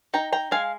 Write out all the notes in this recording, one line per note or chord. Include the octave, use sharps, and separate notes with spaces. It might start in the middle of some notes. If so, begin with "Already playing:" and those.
D#4 G5 A#5
G5 A#5
G#3 F5 G#5